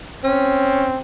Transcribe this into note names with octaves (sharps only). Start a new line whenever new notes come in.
C4 C#4